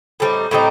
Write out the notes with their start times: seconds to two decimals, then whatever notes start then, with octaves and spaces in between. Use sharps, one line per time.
0.20 A2 G3 C4 D#4
0.51 A2 G3 C4 D#4